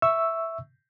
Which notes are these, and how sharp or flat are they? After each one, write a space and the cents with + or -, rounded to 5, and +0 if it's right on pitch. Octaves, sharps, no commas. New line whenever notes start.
E5 +0 C#6 +0 E6 +0